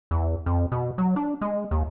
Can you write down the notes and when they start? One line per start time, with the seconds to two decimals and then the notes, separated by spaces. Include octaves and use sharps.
0.11 E2
0.46 F2
0.72 B2
0.98 F#3
1.16 D4
1.41 G#3
1.71 D#2